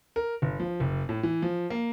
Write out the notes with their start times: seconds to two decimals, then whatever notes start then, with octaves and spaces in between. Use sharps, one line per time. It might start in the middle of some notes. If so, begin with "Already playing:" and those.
0.16 A#4
0.42 G1
0.60 F3
0.80 F#1
1.09 A2
1.23 E3
1.42 F3
1.70 A#3